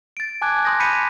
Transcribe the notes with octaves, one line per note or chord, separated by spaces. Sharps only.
A6 D7
G#5 A5 D6 F#6 G#6
C6 D#6 G6 A#6
B5 G6 B6 C#7 D#7